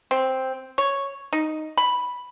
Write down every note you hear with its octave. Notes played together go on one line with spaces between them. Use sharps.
C4
C#5
D#4
B5